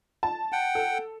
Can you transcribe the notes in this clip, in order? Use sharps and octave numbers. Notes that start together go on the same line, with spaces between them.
A5
F#5 G5
A4